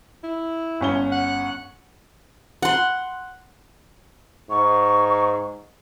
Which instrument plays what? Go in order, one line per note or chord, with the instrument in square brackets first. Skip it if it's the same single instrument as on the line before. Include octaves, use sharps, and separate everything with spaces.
[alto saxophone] E4
[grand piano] G1 C#4 G7
[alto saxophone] F#5
[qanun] F#5 C6
[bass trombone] G#2 [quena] C#6